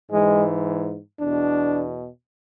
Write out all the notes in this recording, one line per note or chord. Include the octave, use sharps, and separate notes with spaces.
G#2 E3 G#3
E2 B2 D4